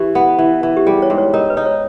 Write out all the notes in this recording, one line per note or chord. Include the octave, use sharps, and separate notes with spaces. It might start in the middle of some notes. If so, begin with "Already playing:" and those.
Already playing: E3 E4 G4
B3
E3
E3
G4
G3 G#4
C#5
G#2
C#5
D#4 A#4
B4
D#4
C#5